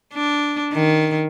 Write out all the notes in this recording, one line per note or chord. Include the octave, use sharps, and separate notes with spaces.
D4
D#3